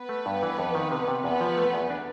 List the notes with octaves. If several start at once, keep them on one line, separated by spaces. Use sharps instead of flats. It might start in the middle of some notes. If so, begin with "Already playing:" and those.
Already playing: B3 B4
A3
G2
E3
F2
D#3
C3
C3
E2 B3 B4
F3
A3
E2
D4